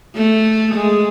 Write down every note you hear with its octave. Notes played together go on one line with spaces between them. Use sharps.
A3
G#3